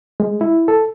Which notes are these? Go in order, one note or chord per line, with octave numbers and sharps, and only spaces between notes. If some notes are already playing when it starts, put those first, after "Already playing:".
G#3
E4
A4